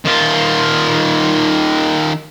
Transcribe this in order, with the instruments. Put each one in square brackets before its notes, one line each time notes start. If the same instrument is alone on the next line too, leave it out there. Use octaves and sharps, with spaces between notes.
[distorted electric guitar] D#3 F4